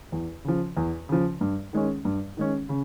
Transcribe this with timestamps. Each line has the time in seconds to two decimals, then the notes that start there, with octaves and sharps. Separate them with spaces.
0.12 E2
0.44 C#3 F3
0.77 E2
1.09 C#3 F3
1.41 G2
1.73 D#3 G#3 C#4
2.05 G2
2.37 D#3 G#3 C#4
2.69 C#3